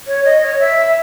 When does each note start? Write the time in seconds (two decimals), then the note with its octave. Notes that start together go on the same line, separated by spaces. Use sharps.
0.07 C#5
0.25 D#5
0.42 C#5
0.59 E5